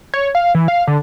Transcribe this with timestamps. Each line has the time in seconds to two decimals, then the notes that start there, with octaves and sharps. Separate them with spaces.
0.14 C#5
0.35 F5
0.55 E3
0.68 F5
0.87 D3